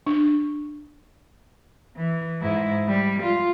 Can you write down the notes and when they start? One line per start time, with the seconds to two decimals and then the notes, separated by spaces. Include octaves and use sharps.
0.07 D4
1.96 E3
2.41 G#2 E4
2.88 G3
3.22 F4